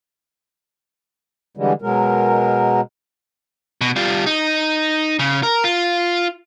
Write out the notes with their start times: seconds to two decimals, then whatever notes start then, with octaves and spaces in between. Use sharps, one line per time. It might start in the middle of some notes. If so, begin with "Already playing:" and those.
1.57 D3 E3 G3 G#3
1.82 B2 F#3 G#3 A#4
3.81 B2
3.96 G3 F4
4.26 D#4
5.19 C#3
5.43 A#4
5.64 F4